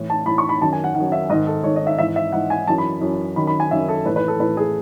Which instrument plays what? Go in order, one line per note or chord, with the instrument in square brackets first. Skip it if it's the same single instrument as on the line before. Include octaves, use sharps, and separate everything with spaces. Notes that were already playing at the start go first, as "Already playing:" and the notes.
Already playing: [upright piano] A2 E3
A5
A2 E3 B5
C#6
B5
F#2 D#3 A5
G#5
F#5
D#3 F#5
F#2
E5
G#2 D#5
D#3
A4
G#2 D#3 C#5
D#5
E5
G#2 E3 E5
E5
G#2 E3 F#5
G#5
F#2 E3 A5
B5
F#2 E3
F#2 D#3 B5
B5
G#5
F#2 D#3 E5
A4
A2 B4
E3
B4
A4
A2 E3 B4
G#4